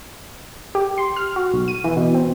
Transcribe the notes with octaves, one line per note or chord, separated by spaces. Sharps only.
G4
C6
F6
F#4
B1
D#7
E3
B2
C4